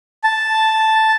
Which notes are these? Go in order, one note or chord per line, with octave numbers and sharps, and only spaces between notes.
A5